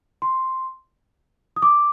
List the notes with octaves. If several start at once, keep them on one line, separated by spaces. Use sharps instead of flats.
C6
D#6
D6